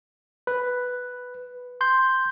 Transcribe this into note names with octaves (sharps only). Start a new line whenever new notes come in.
B4
C6 G6